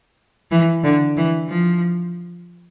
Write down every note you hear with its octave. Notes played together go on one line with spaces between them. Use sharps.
E3
D3
E3
F3